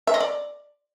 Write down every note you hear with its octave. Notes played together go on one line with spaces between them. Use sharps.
E5
D#5
D5